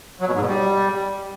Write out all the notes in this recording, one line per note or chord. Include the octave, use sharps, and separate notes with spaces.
F#3
B2
G#2
B2
G3